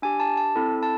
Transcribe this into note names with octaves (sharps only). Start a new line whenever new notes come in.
D4 G4 G#5
A5
A5
C4 E4 A4
A5